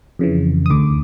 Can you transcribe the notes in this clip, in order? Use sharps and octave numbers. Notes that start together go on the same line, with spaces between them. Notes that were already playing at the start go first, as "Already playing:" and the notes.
F2 C#3 E3
D#6
D2 D3 D6